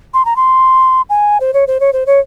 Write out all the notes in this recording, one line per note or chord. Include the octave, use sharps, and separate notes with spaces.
C6
A#5
C6
G#5
C5
C#5
C5
C#5
C5
C#5